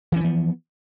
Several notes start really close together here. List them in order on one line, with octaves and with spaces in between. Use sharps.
E3 C#4 F3 B3